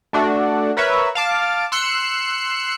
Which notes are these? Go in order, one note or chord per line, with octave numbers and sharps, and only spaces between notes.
A3 D4 F#4
A#4 B4 C#5 E5
F5 A5 D6
C6 E6 F#6 C#7